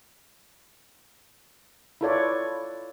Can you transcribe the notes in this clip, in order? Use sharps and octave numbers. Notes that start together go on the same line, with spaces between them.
E4 F4 A4 B4 C#5 D5